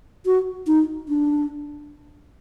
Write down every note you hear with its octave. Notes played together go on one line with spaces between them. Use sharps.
F#4
D#4
D4